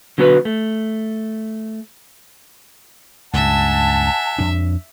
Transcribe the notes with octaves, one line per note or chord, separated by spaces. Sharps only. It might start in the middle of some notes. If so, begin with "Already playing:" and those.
D3 F#3 B3 F#4 A4 B4
A3
C#2 G2 E5 F#5 G#5 A5
F2 D4